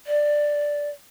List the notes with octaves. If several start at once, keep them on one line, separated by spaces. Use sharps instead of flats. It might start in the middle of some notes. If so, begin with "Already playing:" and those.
D5